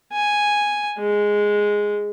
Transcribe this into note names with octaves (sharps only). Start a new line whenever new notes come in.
G#5
G#3